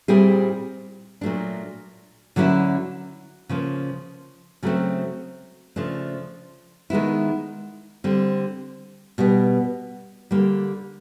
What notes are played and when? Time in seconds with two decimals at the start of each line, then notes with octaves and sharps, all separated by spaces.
0.08 A#2 G3 C4 E4 G#4
1.21 A#2 F#3 A3 D4
2.36 D3 F#3 A#3 C#4 E4
3.49 C#3 F3 A#3
4.63 C#3 F#3 A3 C4
5.76 C#3 F3 A3 D4
6.90 D#3 G#3 B3 E4
8.04 D3 G3 C4
9.18 B2 G3 B3
10.31 D3 G3 A#3